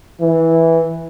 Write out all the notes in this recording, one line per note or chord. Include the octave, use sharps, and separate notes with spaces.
E3